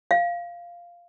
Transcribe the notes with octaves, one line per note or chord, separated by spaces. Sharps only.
F5